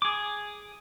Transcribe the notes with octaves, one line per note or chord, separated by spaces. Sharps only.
G#4 D6